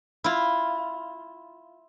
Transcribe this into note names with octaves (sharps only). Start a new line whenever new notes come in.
E4 F4